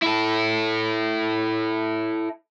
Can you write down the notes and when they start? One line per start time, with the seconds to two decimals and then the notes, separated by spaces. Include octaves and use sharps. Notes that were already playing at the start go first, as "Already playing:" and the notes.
0.02 E4 A4